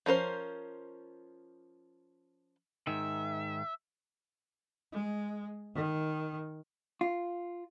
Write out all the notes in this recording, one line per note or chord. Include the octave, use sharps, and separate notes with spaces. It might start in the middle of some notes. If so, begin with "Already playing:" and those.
F3 C#4 A#4 C5
G#2 D#3 E5
G#3
D#3
F4